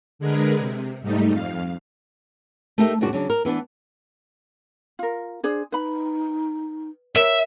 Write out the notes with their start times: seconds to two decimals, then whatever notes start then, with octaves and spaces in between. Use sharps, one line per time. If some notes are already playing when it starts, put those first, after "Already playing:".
0.19 D3 G#3 G#4 A#4 B4
0.58 C3
1.02 G#2 G3 A3 D#4
1.32 F2 F5
2.78 A3 D#4 G4 A#4 E5
3.01 G2 A#2 C#3 D4 F#4
3.13 C#3 F#3 D4
3.30 A#4
3.45 E3 B3 D4
4.99 F4 A#4
5.43 D4 G#4 C5
5.72 D#4 B4 B5
7.16 A#4 C#5 E5